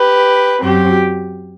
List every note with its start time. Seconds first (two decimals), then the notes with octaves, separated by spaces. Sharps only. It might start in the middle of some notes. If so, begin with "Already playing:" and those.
Already playing: G4 B4
0.61 F#2 F#3 C4 G4